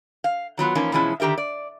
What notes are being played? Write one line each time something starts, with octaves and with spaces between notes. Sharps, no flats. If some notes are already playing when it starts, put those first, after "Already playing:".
F5
D#3 F#3 B3 F4
E3 F3 A#3 C#4 D#4
B2 E3 F3 G#3 C#4 E4
D3 D#3 G4 A#4 E5
D5